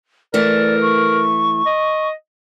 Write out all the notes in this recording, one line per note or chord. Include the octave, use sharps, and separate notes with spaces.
E3 A3 A#4 D5
C#6
D#5